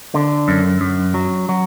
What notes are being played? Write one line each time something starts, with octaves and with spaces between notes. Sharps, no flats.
D3
F#2
F#2
F#3
F#3